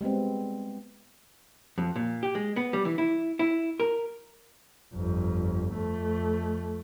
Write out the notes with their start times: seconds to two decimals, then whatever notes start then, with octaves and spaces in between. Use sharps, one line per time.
0.01 G3 G#3 B3 C4
1.78 F2
1.96 A#2
2.23 G4
2.35 G#3
2.56 B3
2.73 G3
2.85 E3
2.98 E4
3.39 E4
3.80 A#4
4.94 G1 F2
5.74 F2 A3